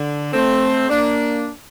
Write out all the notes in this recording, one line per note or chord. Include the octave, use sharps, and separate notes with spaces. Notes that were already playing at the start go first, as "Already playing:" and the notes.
Already playing: D3
A3 C4
A#3 D4